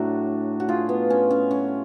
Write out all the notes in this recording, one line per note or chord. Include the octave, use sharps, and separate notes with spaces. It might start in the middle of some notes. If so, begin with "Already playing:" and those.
Already playing: A2 F#3 A3 D4 F#4
F#4
F4 G#4
B3
C#4
C#4
C#4